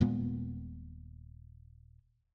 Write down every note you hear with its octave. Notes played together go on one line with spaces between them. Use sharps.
D#1 A#2 G#3 B3